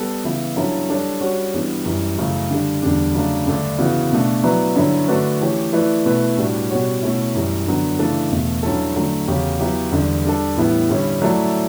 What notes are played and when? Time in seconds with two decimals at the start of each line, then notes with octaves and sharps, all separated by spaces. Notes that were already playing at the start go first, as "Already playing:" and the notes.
Already playing: G3 B3 A4
0.24 C#3 E3 B3 E4
0.56 G2 F#3 C#4 E4 A4
0.89 G3 D4 A4 C#5
1.21 G3 C#4 F#4 C#5
1.53 G2 E3 G3 B3
1.85 F#2 E3 G3
2.18 F#2 C#3 E3 A3 E4
2.50 D3 G3 D4
2.82 E2 D3 G3 D4
3.15 C#3 F#3 A3 D4
3.47 G2 D3 A3 D4
3.79 C#3 E3 B3 F#4
4.12 B2 A3 D4
4.43 F#3 B3 E4 B4 D5
4.76 G2 D3 F#3 C#4 E4
5.08 D3 A3 D4 F#4 B4
5.41 E3 A3 C#4 G4 C#5
5.73 E3 A3 E4 B4 D5
6.05 B2 A3 E4 B4
6.38 A2 G3 D4 F#4
6.69 B2 G3 C#4 F#4 C#5
7.02 B2 A3 C#4 E4
7.34 F#2 E3 G3
7.67 G2 D3 F#3 B3
7.99 C#3 E3 A3 D4 A4
8.31 E2 B2 A3
8.63 G2 F#3 C#4 E4 A4
8.96 D3 F#3 A3
9.28 E2 C#3 F#3 C#4 G4
9.60 F#3 B3 E4 G4
9.92 E2 D3 G3
10.25 G3 D4 A4
10.57 A2 E3 G3 B3 E4
10.89 G2 D3 G3 C#4 E4
11.22 F#3 A3 E4 A4 D5